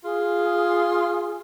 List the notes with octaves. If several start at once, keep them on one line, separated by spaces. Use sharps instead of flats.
F4 G#4